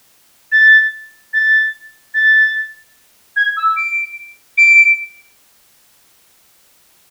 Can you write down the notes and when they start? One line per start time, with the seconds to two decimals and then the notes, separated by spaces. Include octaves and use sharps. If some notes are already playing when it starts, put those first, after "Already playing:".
0.52 A6
1.33 A6
2.14 A6
3.36 G#6
3.57 E6
3.77 D7
4.58 D7